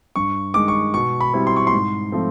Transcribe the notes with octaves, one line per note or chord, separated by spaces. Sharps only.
G2 C#6
D#3 G#3 D6
C#6
B2 C#6
B5
G3 C4 E4
C6
C#6
C6
G#2
F3 A3 C4